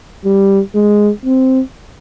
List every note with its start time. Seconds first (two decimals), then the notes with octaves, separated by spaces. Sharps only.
0.25 G3
0.75 G#3
1.25 C4